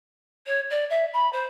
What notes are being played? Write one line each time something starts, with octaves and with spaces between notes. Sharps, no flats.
C#5
D5
E5
B5
C5